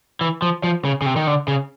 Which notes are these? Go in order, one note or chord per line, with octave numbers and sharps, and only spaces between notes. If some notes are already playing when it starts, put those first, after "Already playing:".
E3
F3
F3
C#3
C#3
C3
D#3
D3
C#3